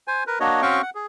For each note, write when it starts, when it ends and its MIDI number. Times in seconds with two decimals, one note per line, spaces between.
0.08 0.24 72
0.08 0.24 80
0.27 0.39 70
0.27 0.39 71
0.40 0.62 58
0.40 0.62 62
0.40 0.62 66
0.40 0.62 73
0.40 0.62 75
0.62 0.82 60
0.62 0.82 61
0.62 0.82 66
0.62 0.82 77
0.62 0.82 79
0.62 0.82 85
0.82 0.90 78
0.95 1.06 68